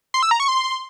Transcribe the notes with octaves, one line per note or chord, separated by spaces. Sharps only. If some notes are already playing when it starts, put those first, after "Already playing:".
C6
E6
A#5
C#6
C6